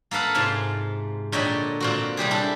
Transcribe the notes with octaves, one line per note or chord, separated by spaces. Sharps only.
A#3 A4 B4 F5 F#5
G#2 C3 F4 G#5 A5
A#2 D3 C#5 D#5 G5 B5
A#2 C4 F#4
C3 G3 G4 G#4
D4 E4 A4